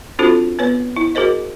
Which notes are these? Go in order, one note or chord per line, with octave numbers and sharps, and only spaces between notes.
C4 D4 F4 F#4 A4 C5
B3 B4 C#5
E4
F#4 G#4 A#4 C5 D#5